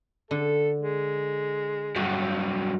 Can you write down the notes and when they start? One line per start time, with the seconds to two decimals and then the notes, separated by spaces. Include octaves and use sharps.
0.31 D3 A4
0.81 G#3
1.96 G2 F#3 F#4